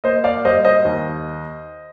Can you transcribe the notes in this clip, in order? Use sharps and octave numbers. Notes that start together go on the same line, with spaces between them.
A#3 C5 D#5
D5 F5
G3 C5 D#5
C5 D#5
D#2